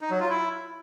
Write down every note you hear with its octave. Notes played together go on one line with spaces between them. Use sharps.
D#4
F#3
F4
E4